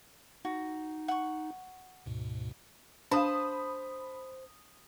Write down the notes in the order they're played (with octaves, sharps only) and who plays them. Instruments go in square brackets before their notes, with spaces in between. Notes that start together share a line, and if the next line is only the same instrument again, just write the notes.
[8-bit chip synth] D#4 [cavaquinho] F#4
[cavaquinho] F#5 C#6
[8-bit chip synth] D2 G#2 B2
[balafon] D4 F5 [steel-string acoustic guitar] C5 A5 [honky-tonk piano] B5 D#6